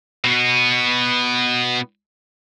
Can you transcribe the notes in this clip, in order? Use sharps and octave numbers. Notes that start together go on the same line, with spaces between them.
B2 B3